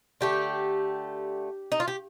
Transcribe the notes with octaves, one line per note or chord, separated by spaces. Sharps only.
D3 A3 G4
D#4
F4
G4